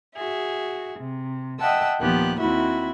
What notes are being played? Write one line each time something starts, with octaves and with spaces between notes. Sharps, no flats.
F#4 G#4 E5
C3
D#5 E5 F#5 G5 A5 E6
D#2 A#2 F3 B3 G4 F#6
D#2 C4 E4 F#4 E5 B5